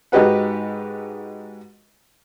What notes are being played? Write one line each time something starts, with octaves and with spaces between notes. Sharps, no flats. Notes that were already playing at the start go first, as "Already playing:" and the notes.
G#2 D#4 F#4 G4 B4 F#5